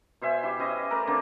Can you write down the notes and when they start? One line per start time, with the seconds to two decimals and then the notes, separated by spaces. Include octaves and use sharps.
0.21 B2 C5 E5 G#5
0.43 E4 G4
0.59 C#4 E4 D#5
0.90 A3 A#4 D5 D6
1.07 D3 A#3 C4 A4